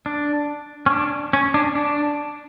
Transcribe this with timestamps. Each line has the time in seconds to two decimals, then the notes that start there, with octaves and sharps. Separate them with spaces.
0.06 D4
0.86 C#4
0.90 D4
1.33 C#4
1.54 D4
1.75 D4